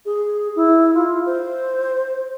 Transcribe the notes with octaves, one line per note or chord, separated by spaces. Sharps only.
G#4
E4
F4
C5